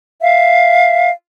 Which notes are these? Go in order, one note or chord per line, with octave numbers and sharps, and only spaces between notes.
E5 F5